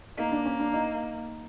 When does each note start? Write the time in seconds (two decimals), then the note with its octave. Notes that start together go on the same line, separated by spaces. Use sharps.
0.17 A#3 D#4
0.32 D4
0.45 C#4
0.60 D4
0.74 D#4